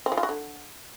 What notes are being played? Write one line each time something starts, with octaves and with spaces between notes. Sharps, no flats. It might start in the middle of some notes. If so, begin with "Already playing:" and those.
C4
F3
F4
F#4
D3